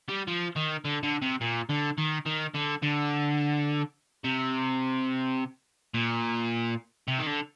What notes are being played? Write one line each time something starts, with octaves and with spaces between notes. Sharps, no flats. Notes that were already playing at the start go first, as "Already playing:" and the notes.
G3
F3
D#3
D3
D3
C3
A#2
D3
D#3
D#3
D3
D3
C3
A#2
C3
D#3
D3